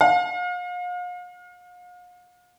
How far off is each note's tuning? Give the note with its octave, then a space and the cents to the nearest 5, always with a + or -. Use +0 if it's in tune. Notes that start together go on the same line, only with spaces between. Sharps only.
F5 +40